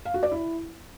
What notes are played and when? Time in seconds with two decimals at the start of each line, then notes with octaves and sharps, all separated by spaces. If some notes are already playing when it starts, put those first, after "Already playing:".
0.05 F5
0.14 F#4
0.23 D5
0.31 E4